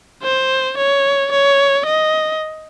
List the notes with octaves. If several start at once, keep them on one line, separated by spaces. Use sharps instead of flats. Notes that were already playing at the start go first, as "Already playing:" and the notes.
C5
C#5
C#5
D#5